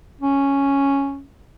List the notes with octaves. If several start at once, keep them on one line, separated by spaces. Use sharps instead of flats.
C#4